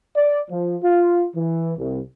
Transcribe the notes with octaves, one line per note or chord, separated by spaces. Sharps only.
D5
F3
F4
E3
C2